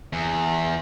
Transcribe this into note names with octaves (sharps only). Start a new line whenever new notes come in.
E2